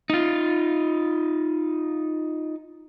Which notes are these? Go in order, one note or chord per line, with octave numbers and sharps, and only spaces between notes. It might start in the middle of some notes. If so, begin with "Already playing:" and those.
D#4 F4